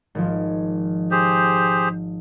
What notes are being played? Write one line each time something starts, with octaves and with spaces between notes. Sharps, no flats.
G#1 F3
G4 G#4 C5